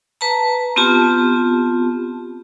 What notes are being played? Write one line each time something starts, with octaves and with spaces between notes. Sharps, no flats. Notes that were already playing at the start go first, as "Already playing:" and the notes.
B4 A5 A#5
B3 C4 F4 G4 A5